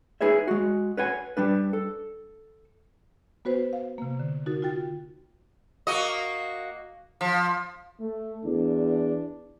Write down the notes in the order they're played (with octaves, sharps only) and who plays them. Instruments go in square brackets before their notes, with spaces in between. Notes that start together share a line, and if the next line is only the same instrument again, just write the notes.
[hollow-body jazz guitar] D#4 G#4 B4 C#5 E5
G#3 F#4
B4 C#5 F#5 G#5
G3 D4 B4
A4
[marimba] B3 F#4 B4 C5
F5
C3 A#3
D3
D#4 F#4 A#4 A6
F4 F#4 G5 A6
[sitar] A#3 F#4 D#5
F3
[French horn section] A3
[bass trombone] E2 [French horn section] D4